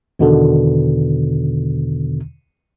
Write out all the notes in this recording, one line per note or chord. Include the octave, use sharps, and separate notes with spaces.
E2 B2 D3 D#3